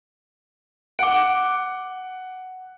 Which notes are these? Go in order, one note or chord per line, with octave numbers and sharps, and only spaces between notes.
F#5 D6 D7